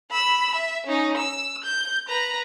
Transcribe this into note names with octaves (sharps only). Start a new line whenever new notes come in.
B5 E6
E5
C#4 D#4
E6
G6
B4 A#5